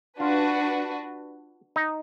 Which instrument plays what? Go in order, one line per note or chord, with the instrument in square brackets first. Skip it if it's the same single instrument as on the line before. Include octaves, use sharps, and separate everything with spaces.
[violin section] D4 F#4 B4 [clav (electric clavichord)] F4
[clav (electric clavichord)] D#4